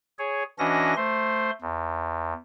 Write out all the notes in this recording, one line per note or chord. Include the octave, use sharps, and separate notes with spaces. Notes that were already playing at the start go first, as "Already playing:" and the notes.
G#4 C#5
E3 C#4 D4 F#4 D#5 A#6
A3 C5 C6
E2